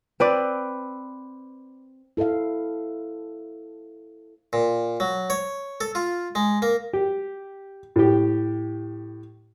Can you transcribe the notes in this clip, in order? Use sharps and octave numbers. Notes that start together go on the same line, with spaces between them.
C4 B4 D5
E4 A4 C5 E5 F5
A#2
F#3
C#5
A4
F4
G#3
A#3
G4
A2 G4